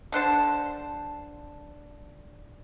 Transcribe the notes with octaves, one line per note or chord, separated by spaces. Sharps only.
D3 D4 C5 A5